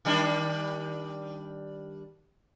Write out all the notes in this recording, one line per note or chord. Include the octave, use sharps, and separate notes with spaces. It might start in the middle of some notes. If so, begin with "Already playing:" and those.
D#3 G3 D4